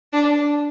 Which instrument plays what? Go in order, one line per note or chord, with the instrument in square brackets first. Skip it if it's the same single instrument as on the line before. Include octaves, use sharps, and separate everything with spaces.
[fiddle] D4